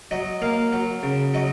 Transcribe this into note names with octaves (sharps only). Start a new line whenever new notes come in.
F#3 D#5
A#3 F5
F#3
C#3
F#3 D#5